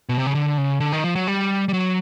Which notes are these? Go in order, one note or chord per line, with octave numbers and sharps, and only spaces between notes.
B2
C3
C#3
D3
C#3
D3
D#3
F3
F#3
G3
G3
F#3